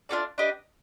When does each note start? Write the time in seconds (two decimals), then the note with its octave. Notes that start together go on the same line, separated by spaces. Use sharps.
0.09 D4 F4 A4 D5
0.38 D4 G4 B4 D#5